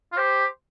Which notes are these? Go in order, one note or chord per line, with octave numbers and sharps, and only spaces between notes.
F4
G4 C5